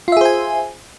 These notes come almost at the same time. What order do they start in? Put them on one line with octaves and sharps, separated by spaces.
F4 E5 G#4 C5 G#5